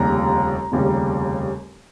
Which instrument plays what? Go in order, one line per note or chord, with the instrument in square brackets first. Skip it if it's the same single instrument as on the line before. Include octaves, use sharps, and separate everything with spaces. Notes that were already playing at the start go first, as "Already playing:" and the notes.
Already playing: [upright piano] F1 D#2 C#3 G3 A#5
F1 D#2 C#3 G3